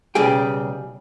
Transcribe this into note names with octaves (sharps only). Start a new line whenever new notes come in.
B1 C#3 G3 G4 G#4 G5